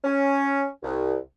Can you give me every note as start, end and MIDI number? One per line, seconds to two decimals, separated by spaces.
0.04 0.66 61
0.83 1.17 36